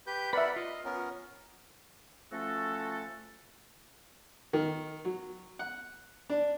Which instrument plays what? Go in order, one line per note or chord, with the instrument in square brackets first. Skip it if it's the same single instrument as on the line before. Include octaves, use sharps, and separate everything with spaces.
[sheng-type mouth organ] G4 B4 G6
[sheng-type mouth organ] A#4 D5 F#5 [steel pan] B4 E5 [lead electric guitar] B5
[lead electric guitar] F4 [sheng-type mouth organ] D#5
[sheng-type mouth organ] B3 C#4 A#4
[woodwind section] F3 A3 C#4 F#4 A4
[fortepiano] D#3
F#3
F#5
D4